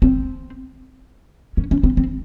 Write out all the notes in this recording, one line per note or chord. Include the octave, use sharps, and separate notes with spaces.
C4
C#4
C#4
C4
C4